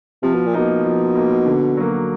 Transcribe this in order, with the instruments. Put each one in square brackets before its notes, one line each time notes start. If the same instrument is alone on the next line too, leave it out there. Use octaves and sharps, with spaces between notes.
[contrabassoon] C3 [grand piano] F3
[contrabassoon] B2
A#2
[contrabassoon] B2 [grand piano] A#3 D#4
[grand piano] F3
A#3 D#4
D3
F#3 A#3